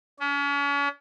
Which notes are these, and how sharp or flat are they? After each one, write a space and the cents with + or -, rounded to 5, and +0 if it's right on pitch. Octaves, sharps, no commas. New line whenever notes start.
C#4 +40